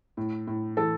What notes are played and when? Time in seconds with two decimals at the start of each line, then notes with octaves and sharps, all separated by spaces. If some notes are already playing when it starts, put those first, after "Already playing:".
0.17 A2
0.47 A2
0.77 E3 A4